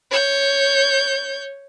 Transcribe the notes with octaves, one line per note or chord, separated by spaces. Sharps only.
C#5 G6